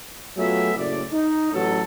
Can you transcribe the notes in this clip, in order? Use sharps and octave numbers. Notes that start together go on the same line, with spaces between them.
F#3 A3 B3 F4 G#4 E5
F#1 A2 D5
D#4
A1 F#3 A4